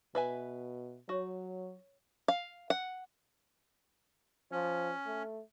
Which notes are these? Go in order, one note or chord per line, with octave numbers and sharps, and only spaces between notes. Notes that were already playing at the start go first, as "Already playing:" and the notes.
B2 B4 E5 G#5
F#3 F#4 C#5 C#6
F5
F#5
F3 C#4
A3